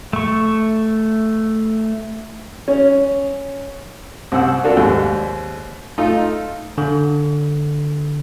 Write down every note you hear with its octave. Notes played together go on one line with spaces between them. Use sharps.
A3 C#6
C#4
C2 C4 F#5 E6
D4 F4 F#4 A4 A#4
D#2 G#2
A3 D#4 F4
D3